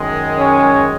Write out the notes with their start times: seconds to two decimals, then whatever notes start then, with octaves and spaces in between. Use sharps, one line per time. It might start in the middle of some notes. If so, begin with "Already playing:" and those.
Already playing: F#2 D#3 G#3
0.39 C#4